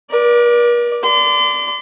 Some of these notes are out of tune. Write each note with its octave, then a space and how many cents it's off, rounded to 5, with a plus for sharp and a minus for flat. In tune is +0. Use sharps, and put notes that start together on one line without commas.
A#4 +45 D5 +0
D5 -5 C6 -40